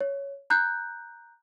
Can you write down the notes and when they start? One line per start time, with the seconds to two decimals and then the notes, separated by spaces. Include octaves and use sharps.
0.01 C#5
0.50 A#5 F#6 G6